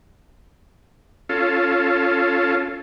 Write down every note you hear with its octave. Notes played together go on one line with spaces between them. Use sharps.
C#4 F4 A4